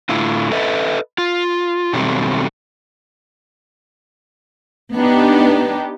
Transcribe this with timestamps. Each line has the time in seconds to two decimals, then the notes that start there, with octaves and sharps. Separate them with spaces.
0.09 A2 D3 E4 F4
0.52 A4 B4 D#5 E5
1.18 F4
1.93 B2 D#3 F#3 G3 A3 C4
4.94 B3 D4 D#4 G4